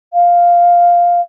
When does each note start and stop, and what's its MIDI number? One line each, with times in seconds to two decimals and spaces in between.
0.13 1.20 77